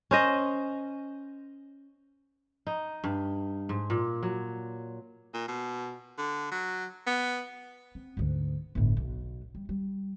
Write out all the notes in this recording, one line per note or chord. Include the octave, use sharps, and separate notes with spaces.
C#4 C5 D#5
D#4
G2
G#2
A#2
F#3
A#2
B2
D3
F#3
B3
C4
D2 G#2
G1 A2
B1
G3
G3